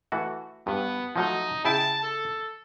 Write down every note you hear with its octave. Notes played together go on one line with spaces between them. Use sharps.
E3 A3 F#4
G2 B3
F3 F#3 A3 D#4
C#3 E4 G5 A5
A4